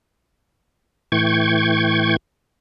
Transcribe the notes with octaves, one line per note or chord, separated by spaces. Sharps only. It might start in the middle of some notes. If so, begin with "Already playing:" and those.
A2 E3 G5 C#6 G#6